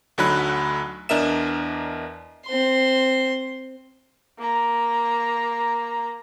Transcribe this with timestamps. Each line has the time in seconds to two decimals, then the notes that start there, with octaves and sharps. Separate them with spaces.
0.18 D2 D3 F#3 D#4 B5 F#6
1.09 E2 D4 A#4 D#5 E5 E7
2.46 C4 C6
4.39 A#3 A#5